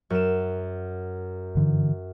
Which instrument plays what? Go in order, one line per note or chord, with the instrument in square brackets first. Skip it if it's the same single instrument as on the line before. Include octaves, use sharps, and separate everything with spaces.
[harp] F#2 E7
[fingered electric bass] G2 D3 E3